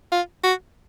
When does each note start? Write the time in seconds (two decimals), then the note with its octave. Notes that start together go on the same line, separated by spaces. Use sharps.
0.12 F4
0.44 F#4